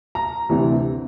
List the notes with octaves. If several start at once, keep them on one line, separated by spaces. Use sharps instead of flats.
A#5
D2 C3 E3